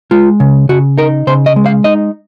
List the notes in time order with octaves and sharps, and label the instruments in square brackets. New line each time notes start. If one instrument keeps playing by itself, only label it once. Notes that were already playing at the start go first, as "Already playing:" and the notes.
[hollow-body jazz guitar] G#3 F4
C#3
C#3 F#4
D#4 A#4
C#3 C5
D#5
G#3
F5
D#4 D#5